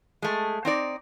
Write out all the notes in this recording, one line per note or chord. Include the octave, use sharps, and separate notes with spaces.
G#3 A3
C4 D#4 D5